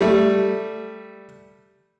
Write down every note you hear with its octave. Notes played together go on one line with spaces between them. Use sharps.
G3 A3